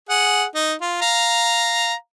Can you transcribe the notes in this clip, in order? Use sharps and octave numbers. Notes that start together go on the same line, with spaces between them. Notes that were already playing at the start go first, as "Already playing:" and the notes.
G#4 F#5
D#4
F4
F5 A#5